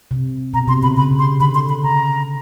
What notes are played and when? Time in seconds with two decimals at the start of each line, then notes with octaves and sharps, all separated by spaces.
0.11 C3
0.53 B2 A#5
0.68 C3 C6
0.83 C#3 B5
0.97 C#3 B5
1.11 C#3
1.19 C6
1.40 D3 B5
1.55 C6
1.69 B5
1.83 C#3 A#5